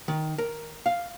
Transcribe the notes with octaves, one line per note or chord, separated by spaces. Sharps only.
D#3
A#4
F5